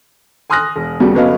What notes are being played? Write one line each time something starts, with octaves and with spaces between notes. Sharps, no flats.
G#5 C6 D#6 F6 F#6 A#6
E1
D#2 C#3 G3 F#4
G1 F#3 B3 C#4 D#5 F5